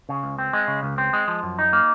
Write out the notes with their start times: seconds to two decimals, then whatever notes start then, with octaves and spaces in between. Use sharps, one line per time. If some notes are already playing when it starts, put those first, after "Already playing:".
0.09 C#3
0.23 C#2
0.38 C4
0.53 G#3
0.68 C#3
0.83 C#2
0.98 C4
1.13 G#3
1.28 F3
1.43 F#2
1.59 D#4
1.73 A#3